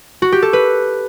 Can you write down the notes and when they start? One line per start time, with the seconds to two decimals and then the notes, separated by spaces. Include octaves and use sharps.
0.22 F#4
0.32 G4
0.42 A4
0.53 B4